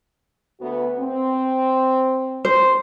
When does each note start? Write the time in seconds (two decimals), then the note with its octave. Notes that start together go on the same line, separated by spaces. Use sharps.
0.61 D2 B3 F#4
0.98 C4
2.45 C5